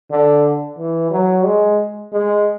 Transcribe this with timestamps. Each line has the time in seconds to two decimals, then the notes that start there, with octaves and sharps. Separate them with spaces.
0.11 D3
0.79 E3
1.11 F#3
1.45 G#3
2.12 G#3